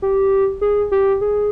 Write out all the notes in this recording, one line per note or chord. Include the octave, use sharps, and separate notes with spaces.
G4
G#4
G4
G#4